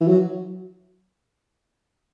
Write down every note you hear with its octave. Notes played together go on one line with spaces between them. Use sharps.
E3
F#3